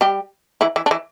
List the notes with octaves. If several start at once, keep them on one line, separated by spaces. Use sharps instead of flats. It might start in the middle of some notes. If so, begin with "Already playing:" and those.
G3 G4
E3 E4
E3 E4
D4
E3 E4